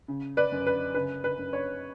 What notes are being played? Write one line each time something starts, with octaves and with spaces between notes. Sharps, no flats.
C#3
B4 D5
F#2
B4
C#3 B4
B4
F#2
C#5